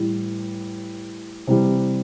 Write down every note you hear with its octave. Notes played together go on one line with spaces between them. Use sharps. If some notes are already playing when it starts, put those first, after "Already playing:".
Already playing: A2 E3 G3
C3 E3 G3